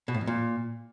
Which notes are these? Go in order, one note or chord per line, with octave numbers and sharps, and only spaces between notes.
B2
A2
F2
A#2